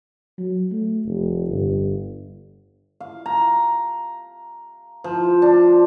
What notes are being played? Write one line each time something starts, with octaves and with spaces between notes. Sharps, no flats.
F#3
A3
F1
G1
F5
A#5
F3
D4